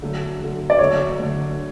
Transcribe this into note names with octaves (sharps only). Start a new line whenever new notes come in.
D3 F#3 A3
D3 F#3 A3
D5
D3 F#3 A3 C#5
D3 F#3 A3